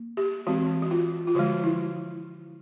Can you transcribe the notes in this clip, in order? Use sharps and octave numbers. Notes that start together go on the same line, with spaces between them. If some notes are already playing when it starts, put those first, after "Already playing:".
Already playing: A#3
G4
E3 G#3 C4 F#4
F#4
F4
F4
D3 F3 G#3 F#4
E4